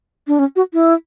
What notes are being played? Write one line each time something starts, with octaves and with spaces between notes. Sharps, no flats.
D4
C#4
F#4
E4